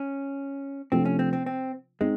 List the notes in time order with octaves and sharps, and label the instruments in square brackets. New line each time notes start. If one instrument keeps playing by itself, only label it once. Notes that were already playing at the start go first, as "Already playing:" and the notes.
Already playing: [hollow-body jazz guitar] C#4
[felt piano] C3 F3 A3 D4 F4 [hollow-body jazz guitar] C4
[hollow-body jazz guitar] C#4
C4
C4
C4
[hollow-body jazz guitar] G#3 [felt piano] C4 D#4